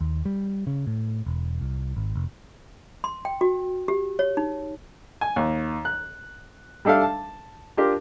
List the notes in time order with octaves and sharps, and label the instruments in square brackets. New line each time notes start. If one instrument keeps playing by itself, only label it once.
[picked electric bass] D#2
G3
C#3
A2
E1
C2
G#1
F1
[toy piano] C6
G5
F#4
G4
C#5
D#4
[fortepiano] G#5
D#2
F#6
G3 D4 A4 E5 F5
A5
D4 F4 G4 A#4